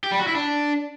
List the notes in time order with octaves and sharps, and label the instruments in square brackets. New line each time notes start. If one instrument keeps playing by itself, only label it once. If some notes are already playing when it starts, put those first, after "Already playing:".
[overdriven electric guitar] G4
G3
F#4
E4
D4